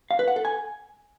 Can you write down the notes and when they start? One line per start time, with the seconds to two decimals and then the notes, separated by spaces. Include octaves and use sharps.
0.11 F5
0.19 B4
0.28 F#5
0.36 A4
0.45 G#5